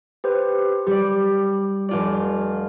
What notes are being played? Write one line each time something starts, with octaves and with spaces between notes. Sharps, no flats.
G4 B4 C5
G3 G4 D5
F1 F4 D5